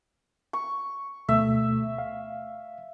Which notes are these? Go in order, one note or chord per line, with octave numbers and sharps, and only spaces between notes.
C#6
D2 B2 A3 E5
F5